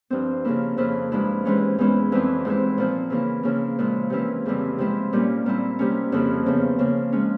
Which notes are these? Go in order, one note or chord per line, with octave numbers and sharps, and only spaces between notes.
G2 F3 C4
C#3 F3 A#3 E4
F2 C#3 F3 A#3 E4
G2 F3 G#3 E4
G#2 E3 G#3 C#4
E2 E3 G#3 C#4 E4
F2 E3 G3 C4 E4
G#2 E3 G#3 C4 E4
A#2 F3 C4
C#3 E3 A#3 E4
C#3 F3 A#3 C#4 E4
A#2 F3 G#3 E4
C3 E3 A#3 C#4 E4
F2 C#3 E3 G3 C4
C3 F3 G#3 C4 E4
A#2 G3 A#3 C#4
A#2 G3 C4 E4
C3 G3 A#3 C#4
F2 C#3 F3 A#3 E4
E2 C#3 F3
C#3 F3 A#3
F3 G#3 C#4